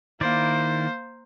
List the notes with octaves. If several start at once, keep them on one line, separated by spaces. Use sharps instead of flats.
D#3 A#3 E4 C5 D5